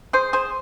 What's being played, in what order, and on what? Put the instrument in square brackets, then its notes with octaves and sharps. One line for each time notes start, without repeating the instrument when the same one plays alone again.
[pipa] G#4 C5
G#4 C5